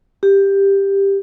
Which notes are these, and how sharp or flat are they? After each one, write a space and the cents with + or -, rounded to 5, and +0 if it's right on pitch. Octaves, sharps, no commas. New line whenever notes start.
G4 +10